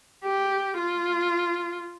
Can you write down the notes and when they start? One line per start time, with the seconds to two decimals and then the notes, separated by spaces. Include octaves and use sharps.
0.24 G4
0.78 F4